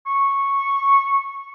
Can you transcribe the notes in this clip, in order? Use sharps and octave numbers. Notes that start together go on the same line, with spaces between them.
C#6